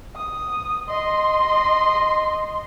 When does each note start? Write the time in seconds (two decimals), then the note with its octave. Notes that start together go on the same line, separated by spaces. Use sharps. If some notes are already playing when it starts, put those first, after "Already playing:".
0.16 D#6
0.87 D#5 C6